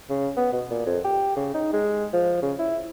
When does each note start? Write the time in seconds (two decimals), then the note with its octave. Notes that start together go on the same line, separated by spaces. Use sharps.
0.10 C#3
0.37 B3
0.53 B2
0.70 A#2
0.86 F2
1.04 G4
1.36 C#3
1.54 D#4
1.73 G#3
2.13 F3
2.42 C#3
2.59 E4